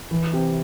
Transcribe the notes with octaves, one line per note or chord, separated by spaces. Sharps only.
E3
C3